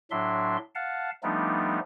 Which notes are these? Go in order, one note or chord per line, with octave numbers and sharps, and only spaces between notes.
A2 F#3 D4 E5 C6
F5 F#5 A5
F3 G3 A3 B3 D4 D#4